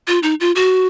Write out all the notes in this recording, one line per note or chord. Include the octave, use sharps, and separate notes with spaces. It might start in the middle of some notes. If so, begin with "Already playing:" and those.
F4
D#4
F4
F#4